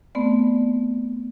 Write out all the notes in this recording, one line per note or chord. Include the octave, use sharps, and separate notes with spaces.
A3 B3 C4 D5